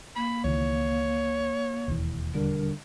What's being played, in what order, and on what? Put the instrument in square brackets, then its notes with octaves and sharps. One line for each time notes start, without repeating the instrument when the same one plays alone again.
[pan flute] A#3 [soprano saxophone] B5
[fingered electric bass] C#2 D#3 E3 [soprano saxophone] C#5
[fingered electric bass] E1 D#2 E3
[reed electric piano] D3 G3 D4 [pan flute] A#4